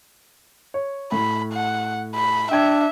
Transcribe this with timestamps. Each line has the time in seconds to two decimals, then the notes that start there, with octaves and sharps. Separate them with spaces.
0.74 C#5
1.12 A2 B5
1.53 F#5
2.15 B5
2.51 D4 E5 G5 G#6